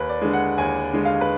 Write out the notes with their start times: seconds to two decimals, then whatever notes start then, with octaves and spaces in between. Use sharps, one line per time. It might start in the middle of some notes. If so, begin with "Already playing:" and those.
Already playing: D#2 B4
0.09 D5
0.21 D3 G#3
0.33 F#5
0.58 D#2 G#5
0.93 D3 G#3
1.05 F5
1.21 B4